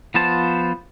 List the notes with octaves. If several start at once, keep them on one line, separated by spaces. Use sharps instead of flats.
F3 B3 F4 C5 A5